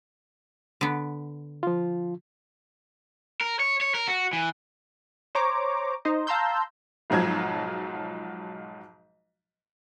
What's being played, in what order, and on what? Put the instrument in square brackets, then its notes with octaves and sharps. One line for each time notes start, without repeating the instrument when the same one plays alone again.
[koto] D3 B3
[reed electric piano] F3 F4
[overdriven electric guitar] A#4
C#5
C#5
A#4
F#4
E3
[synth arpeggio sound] C5 C#5 A#5 D6
D#4 C5 D#5
F5 A5 A#5 C6 E6 G6
[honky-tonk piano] B1 G#2 F3 F#3 G#6